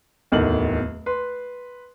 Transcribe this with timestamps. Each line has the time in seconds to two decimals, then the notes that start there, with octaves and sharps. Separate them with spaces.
0.32 D1 E2 D#3 A4 F#7
1.06 B4 C6